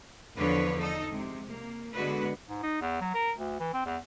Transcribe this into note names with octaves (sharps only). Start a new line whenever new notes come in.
E2 D3 F3 D4 B4 C#5
D#4 A4 D#5
C3 G#3
A#3
D3 G#3 B3 F#4 B4
G#2
D#4
E2
F#3
A#4
D2
E3
C4
E2